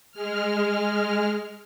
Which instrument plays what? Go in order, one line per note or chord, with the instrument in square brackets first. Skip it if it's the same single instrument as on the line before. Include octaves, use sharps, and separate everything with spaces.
[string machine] G#3 F6